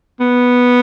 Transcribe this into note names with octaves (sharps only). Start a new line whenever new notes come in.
B3